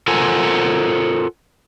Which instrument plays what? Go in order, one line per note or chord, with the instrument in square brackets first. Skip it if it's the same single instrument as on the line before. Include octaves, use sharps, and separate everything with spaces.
[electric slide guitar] F4 A4 A#4 C5 F#5 G#5